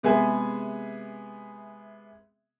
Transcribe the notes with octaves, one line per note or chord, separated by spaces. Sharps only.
C3 G#3 B3 G#4 E5 G#5